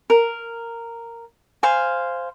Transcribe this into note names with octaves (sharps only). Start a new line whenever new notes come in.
A#4
C5 F5 G#5